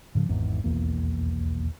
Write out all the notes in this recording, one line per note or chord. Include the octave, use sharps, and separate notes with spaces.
G#2 C#3 F3
G#1 E2 G#2
D#1 B1 E2 A#3